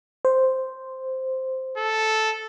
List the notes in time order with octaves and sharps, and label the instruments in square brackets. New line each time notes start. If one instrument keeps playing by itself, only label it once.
[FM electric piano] C5
[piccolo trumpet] A4